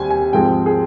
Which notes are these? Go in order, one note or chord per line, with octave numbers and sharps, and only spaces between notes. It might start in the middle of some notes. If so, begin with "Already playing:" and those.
Already playing: D#2 G3 C4 G#5
G#5
G#2 F3 G#3 C4 G5
G#4